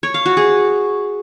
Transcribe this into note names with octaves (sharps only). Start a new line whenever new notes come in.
C#5
F5
F#4
G#4